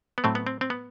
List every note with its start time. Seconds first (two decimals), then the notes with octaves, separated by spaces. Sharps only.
0.18 B3
0.24 A2 F#3 A3 C4
0.35 B3
0.47 C4
0.61 C4
0.70 B3